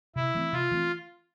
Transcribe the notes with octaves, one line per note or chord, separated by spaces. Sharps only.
C3 E4
E3 A3 C4
C3 F4
E3 A3 C4